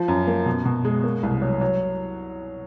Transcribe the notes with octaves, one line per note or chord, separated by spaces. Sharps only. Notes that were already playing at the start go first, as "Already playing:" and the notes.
Already playing: F3
F#2
A#3
B2
B2
G#3
A#3
C2
F#3
F#3